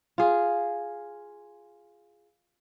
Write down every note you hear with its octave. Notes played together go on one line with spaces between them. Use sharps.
F4 G#4